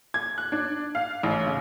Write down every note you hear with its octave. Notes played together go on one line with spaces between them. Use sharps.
G#6
F#6
D4
F5
A1
C#3